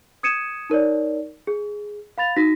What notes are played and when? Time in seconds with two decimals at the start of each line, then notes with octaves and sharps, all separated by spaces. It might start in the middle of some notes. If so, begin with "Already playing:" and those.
0.23 D#6 G#6 C#7 D#7 E7
0.70 D#4 A#4 C#5 D5
1.47 G#4
2.18 F5 B5 A6 F7
2.37 D#4 F#4 A#6 B6